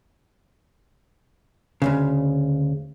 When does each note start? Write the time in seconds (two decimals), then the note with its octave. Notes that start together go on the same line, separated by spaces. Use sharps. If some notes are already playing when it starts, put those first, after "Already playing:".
1.82 D2 G2 C#3